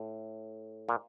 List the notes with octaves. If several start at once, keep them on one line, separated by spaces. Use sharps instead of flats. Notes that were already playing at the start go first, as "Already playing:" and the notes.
Already playing: A2
A#2